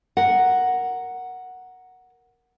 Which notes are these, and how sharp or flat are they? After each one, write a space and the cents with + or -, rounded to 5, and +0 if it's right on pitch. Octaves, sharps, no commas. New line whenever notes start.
A#4 +0 F#5 +0